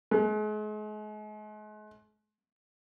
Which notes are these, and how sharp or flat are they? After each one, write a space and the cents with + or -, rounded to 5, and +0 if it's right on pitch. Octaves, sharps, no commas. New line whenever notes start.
G#3 +40